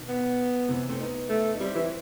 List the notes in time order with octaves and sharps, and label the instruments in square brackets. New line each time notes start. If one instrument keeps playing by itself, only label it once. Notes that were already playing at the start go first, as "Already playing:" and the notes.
Already playing: [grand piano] B2 D#3
[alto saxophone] B3
[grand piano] C3 E3
A3 C4
B3 D#4
[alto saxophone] A3
[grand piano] D#4
[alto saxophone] G3 [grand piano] C4 E4
[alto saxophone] E3 [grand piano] C4 E4